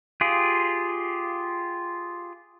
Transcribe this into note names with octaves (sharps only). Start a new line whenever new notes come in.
F4 G4 G#4